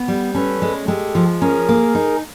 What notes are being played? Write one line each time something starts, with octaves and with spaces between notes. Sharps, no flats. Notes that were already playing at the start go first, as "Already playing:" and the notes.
Already playing: B3
G3
C#4 A4 B4
G#3
G#3 G4 A4
F3
C#4 G#4 A#4
A#3
D#4